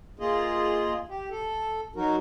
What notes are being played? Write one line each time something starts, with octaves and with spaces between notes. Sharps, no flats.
A#3 F4 G#4 D#5
G4
A4
F#3 D#4 F#4 A#4